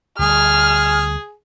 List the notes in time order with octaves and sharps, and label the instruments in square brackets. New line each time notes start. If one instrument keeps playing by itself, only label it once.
[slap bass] D2 D3 G3 [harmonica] G#4 [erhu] F6